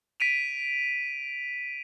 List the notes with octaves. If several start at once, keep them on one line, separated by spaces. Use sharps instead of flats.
B6 D7 D#7 F7